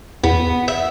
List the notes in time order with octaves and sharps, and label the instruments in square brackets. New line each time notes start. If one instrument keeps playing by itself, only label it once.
[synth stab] E2 [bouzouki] B3
[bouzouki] E5